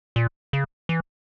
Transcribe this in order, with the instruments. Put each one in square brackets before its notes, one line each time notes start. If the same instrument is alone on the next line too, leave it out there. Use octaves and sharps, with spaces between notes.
[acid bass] A#2
C#3
E3